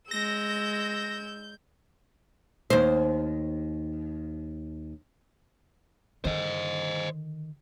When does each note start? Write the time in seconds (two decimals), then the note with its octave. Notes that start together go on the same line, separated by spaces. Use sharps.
0.11 G#3 E6 G6 A#6
2.70 D#2 C5
6.24 D3 D#3 C5 D#5